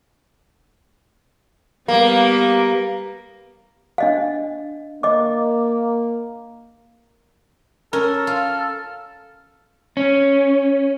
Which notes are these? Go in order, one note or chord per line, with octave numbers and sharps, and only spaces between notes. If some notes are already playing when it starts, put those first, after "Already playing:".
G3 A#3 B3 B4
D4 D#5 F5
A#3 D#5 D6
C#4 A4 A#4
F4 F6
C#4